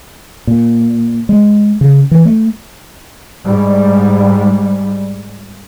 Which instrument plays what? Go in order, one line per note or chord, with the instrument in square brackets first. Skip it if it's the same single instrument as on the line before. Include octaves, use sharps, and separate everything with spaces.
[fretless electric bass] A#2
G#3
C#3
E3
A3
[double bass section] G#2 G3